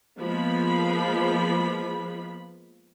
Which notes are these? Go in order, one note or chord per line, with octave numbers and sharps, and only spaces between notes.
F3 G#3 A#3 B3 B5